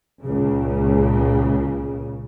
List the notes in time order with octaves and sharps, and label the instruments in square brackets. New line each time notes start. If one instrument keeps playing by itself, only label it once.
[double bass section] C#2 A#2 C#3